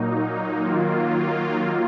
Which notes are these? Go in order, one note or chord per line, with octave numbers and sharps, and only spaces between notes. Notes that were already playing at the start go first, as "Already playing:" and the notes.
Already playing: A#2 F#3 A#3 D#4
D#3 F#3 A#3 F4